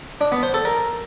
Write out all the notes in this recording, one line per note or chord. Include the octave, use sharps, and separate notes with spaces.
D4
B3
C5
A4
A#4